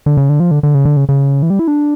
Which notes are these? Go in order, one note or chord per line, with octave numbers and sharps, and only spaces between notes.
D3
C#3
D3
F3
D3
D3
C#3
D3
C#3
C#3
E3
G3
E4
D4